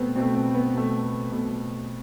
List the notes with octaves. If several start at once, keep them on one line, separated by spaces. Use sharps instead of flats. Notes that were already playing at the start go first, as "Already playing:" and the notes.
Already playing: B2 A3 B3 C4
B2 A3 C4
C4
B3
B2 A3
B2 A3